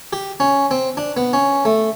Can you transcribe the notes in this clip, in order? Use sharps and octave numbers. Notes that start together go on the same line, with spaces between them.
G4
C#4
C4
D4
B3
C#4
A3